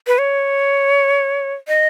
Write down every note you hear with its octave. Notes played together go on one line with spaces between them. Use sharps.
B4
C#5
D#5